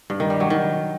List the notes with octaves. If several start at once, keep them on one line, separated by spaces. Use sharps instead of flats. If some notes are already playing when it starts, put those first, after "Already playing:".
G2
D#3
G3
F#3
D#3